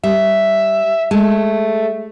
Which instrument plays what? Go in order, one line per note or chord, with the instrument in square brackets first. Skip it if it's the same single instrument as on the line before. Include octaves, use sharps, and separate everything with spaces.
[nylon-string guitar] G3 [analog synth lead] E5
[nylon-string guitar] G#3 [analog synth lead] A3